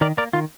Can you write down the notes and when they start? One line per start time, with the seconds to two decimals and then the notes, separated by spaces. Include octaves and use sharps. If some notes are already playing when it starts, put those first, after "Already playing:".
0.01 D#3 A#4 D5
0.17 A#3 A#4 D5
0.33 D#3 F4